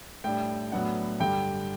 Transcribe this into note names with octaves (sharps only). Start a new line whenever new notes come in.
A2 G3 D4 G5
A2 F#3 B3 D4 F#5
G2 D3 G3 G5